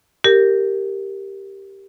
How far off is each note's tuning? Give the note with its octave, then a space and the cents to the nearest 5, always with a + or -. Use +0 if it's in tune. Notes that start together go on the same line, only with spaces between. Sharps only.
G4 +0 A#4 -10